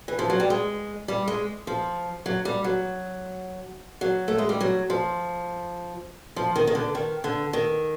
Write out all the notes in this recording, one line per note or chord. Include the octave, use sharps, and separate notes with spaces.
E3
F3
F#3
G3
G#3
G3
G#3
F3
F#3
G3
F#3
F#3
A3
G#3
G3
F#3
F3
F3
D#3
D#3
D3
D#3
D3
D#3